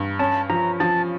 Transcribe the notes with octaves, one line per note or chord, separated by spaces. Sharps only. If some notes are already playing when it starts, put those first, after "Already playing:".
Already playing: G2
C#4 A5
F3 A#5
F3 A5